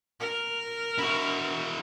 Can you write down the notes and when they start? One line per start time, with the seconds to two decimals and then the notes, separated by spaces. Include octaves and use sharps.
0.20 A#4
0.98 E4 F#4